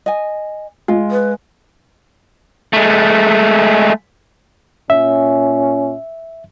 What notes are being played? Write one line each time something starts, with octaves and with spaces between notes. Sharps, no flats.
D#5 G#5
G#3 F4
B4
G#3 A3
A#2 C#4 E5